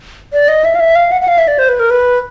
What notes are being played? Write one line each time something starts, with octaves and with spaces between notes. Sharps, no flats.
D5
D#5
E5
F5
E5
F5
F#5
F#5
F5
E5
D5
C5
B4
A#4
B4